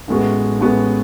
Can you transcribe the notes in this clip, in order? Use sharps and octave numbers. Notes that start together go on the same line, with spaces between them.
A1 A2 G#3 B3 F#4
A1 A2 G#3 B3 F#4